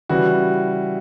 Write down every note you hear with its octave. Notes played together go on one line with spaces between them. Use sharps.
C#3 E3 G3 F#4